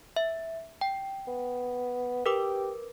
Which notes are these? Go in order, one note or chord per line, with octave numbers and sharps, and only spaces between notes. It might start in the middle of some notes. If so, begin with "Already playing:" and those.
E5
G5
B3
G4 A#4 B4 D6